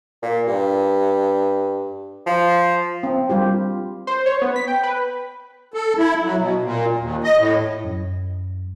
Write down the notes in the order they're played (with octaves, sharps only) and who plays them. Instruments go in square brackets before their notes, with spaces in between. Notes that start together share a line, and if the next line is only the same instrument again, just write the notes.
[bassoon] A#2
G2
F3
[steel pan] C4
G3 F4 G4
[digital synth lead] C5
C#5
B3
B6
G5
B4
[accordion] A4
E4
F#3
B2
A#2
D#2
D#5
A2
[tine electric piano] F#2